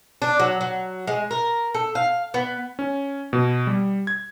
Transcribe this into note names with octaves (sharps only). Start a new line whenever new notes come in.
D4
F#3
F#3
G#3
A#4
A4
F5
B3
C#4
B2
G3
G#6